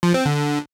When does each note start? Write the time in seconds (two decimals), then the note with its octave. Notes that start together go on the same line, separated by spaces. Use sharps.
0.03 F3
0.14 C4
0.26 D3